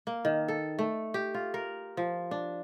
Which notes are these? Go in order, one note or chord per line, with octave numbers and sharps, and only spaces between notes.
A#3
D#3
A4
A3
G4
F4
A#4
F3
D4